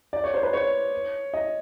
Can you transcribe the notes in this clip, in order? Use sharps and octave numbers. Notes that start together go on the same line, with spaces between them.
D5
C#5
C5
B4
C#5
D#5